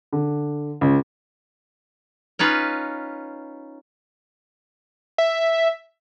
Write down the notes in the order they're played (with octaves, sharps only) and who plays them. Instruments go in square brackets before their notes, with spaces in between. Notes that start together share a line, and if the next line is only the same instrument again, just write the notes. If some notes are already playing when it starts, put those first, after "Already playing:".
[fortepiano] D3
C#2
[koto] C#4 D#4 F4 B4
[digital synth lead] E5